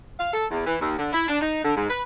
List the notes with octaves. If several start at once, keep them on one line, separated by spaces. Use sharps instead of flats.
F5
A4
E2
E3
D#2
D3
E4
D4
D#4
D3
G#2
B4